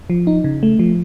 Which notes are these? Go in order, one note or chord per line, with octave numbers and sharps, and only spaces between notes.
F3
D#4
C#3
A3
F3